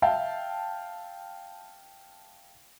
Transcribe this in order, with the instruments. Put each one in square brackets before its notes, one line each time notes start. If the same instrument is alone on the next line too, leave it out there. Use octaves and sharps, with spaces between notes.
[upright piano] E5 F5 G5 A5